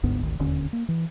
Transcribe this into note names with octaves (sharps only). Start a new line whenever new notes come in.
G1 D2 G#2 B3
G#1 D2 D#3
E1 D#2 D3 C#4
A#3
E3